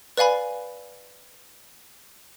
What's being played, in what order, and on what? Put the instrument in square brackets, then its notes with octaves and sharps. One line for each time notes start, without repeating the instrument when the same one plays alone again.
[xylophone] B4 D5 F5 G#5 B5